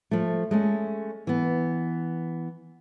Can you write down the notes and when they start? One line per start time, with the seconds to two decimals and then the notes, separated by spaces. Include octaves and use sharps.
0.11 F3 A3
0.51 G#3 A3 C#4
1.27 E3 B3